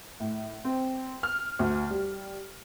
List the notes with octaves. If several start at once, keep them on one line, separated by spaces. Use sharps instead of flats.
A2
C4
F6
D2
G3